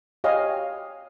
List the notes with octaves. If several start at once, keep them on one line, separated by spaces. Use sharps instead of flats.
G4 C#5 D#5 F5 G#5